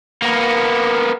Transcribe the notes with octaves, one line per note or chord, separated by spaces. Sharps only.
A#3 B3